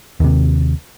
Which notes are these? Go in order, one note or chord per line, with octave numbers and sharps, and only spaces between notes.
D#2 C3